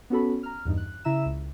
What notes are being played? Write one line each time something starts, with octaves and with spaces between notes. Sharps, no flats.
B3 C#4 F#4 A4 B5
A#5 F6
E2 G2 D#4
F#6
C#3 E4 E5 A#5 E6 E7
C#2